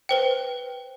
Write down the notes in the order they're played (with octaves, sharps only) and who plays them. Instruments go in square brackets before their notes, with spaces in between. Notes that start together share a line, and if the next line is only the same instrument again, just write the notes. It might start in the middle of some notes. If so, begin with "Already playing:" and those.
[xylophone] B4 C5 G5